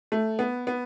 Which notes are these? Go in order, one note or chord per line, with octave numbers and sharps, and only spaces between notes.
A3
B3
B3